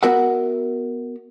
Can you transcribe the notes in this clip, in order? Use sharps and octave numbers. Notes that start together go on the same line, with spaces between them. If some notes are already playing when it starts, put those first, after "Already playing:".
B3 F#4 A#4 E5 F#5